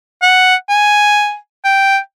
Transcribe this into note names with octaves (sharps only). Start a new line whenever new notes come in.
F#5
G#5
G5